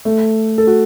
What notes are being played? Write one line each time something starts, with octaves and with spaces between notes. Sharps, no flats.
A3
A4
F#4